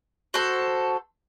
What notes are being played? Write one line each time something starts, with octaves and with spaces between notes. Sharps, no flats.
F#4 A4 C5